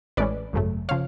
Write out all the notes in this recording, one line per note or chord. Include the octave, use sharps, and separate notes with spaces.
A1 A2 G#3 C#4 B4 D5
G#1 F#2 C#3 F#3 A3
C#3 F3 C#5 F5